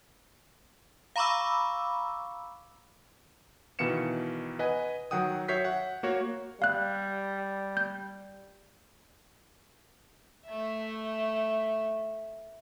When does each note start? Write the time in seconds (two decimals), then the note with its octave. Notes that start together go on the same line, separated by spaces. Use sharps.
1.16 F5 A#5 B5 C#6 D6 E6
3.79 B2 D#3 E3 F5 C#7 E7
4.59 B4 D#5 F#5 G#5
5.11 D#3 F#3 F#5 G5 D#6
5.48 F#4 C#5 E5 G6 B6 C7
5.65 F#5
6.03 A#3 F#4 C#5
6.62 G3 F5 F#6
7.77 G6
10.46 A3 E5